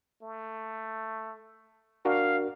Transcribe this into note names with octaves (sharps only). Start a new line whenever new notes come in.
A3
D4 F#4 A#4 F5